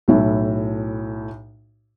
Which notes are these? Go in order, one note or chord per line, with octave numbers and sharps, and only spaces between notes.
B1 A2 E4